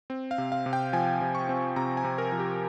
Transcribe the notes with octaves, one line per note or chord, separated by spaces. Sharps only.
C4
F5
C3
F5
C3
G5
F3 G#5
C3
C#6
C4
C3 A#5
G#5
C3
A#4
F3
G4